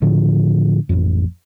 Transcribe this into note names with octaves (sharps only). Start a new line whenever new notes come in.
A2 D3 F3
A1 F2